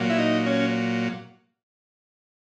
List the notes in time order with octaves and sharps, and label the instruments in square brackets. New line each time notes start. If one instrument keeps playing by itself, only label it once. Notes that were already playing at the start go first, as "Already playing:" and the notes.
Already playing: [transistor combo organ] A#2 F#3
E4
D#4
C#4